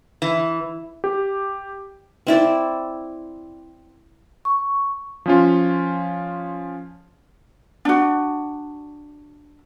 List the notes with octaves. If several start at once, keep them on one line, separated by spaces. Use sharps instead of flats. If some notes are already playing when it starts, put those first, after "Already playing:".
E3
G4
C4 E4 D5
C#6
F3 C#4 F4
D4 F#4